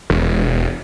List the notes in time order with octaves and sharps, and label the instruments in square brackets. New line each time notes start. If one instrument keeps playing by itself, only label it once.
[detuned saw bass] E1